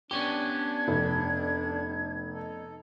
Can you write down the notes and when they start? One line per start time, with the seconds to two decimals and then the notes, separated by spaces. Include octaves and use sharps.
0.11 B3 C#4 D4 G4 C#6 G#6
0.88 F1
2.33 D#4 A4